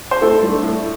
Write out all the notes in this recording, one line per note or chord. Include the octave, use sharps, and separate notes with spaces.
C5
A2 A4
A3 D4
A2